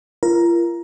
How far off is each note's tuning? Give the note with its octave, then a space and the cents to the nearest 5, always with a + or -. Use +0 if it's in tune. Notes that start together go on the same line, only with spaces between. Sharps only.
F4 -40 A#4 +15